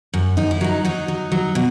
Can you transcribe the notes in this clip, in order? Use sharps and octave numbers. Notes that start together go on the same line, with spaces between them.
F#2
F#2 D#4
E4
F#3 D#4
F#3 D#4
F#3
F#3
B2